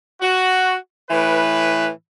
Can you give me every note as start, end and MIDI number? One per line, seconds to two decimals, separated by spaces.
0.21 0.75 66
1.10 1.88 45
1.10 1.88 52
1.10 1.88 71